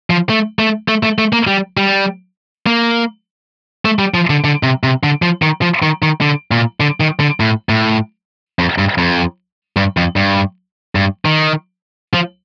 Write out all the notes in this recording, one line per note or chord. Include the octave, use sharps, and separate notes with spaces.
F3
A3
A3
A3
A3
A3
A#3
G3
G3
A#3
A3
G3
F3
D3
D3
C3
C3
D3
F3
D#3
F3
D#3
D#3
D3
A#2
D3
D#3
D3
A2
A2
F2
G2
F2
G2
F2
G2
G2
D#3
F3